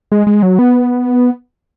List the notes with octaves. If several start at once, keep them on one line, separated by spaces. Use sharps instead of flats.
G#3
G#3
F#3
B3